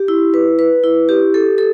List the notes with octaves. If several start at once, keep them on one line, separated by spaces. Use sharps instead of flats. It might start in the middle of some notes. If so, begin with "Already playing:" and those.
Already playing: G4
E4
B4
B4
E4
G4
A4
A4